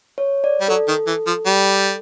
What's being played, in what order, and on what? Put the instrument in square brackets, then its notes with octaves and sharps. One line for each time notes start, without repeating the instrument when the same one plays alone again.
[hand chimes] C#5
D5
[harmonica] G3
[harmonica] F#3 [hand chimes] A4
[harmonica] D#3
E3
F3
G3